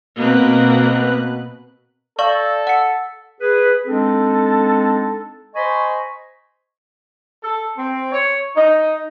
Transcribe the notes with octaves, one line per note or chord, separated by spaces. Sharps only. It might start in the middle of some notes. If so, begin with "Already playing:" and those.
B2 A#3 C4 B4 F#6
A4 D5 F5 C#6
F#5 C#7
G#4 B4
G#3 C4 D4 D#4 A4
C5 D#5 G#5 B5 C#6
A4
C4
C#5
D#4